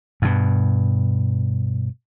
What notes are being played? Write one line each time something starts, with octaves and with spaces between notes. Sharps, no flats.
G2 B2